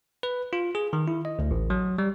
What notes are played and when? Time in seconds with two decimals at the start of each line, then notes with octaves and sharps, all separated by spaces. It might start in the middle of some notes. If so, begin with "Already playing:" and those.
0.23 B4
0.53 F4
0.75 G#4
0.93 D#3
1.08 E4
1.25 D#5
1.39 D2
1.51 A1
1.70 F#3
1.98 G3